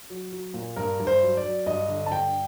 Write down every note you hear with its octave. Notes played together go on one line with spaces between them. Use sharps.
F#3
F#3
A#2
G2 A#4
G2
C5
F#3
D5
F#3
G2 D#5
D3
A5
G2 G5